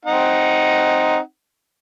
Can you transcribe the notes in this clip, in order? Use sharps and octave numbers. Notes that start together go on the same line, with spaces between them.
C4 D#4 F#5